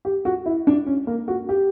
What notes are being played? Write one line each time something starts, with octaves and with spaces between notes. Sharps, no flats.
G4
F#4
E4
D4
C#4
A#3
F#4
G4